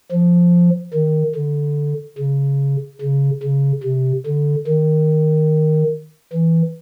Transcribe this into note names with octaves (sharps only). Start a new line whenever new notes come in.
F3
D#3
D3
C#3
C#3
C#3
C3
D3
D#3
E3